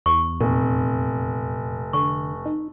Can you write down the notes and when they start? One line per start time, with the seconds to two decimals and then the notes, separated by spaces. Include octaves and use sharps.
0.06 E2 C#6
0.41 F1 A#2
1.93 D3 C#6
2.46 D#4